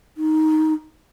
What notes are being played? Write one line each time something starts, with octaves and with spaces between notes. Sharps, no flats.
D#4